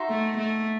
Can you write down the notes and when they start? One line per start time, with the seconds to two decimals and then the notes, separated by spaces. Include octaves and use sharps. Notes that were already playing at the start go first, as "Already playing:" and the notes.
Already playing: D#4 F#4 C5 E5
0.09 A3
0.38 A3